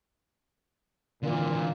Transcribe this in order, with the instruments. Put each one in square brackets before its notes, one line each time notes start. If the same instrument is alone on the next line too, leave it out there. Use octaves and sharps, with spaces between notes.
[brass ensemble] G#1 A#2 [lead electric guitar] D3 E3